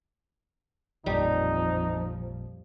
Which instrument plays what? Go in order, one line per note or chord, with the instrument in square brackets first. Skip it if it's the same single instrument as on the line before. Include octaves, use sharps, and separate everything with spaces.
[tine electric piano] A1 A#2 [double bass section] F2 F3 [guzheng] G3 [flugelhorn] D#4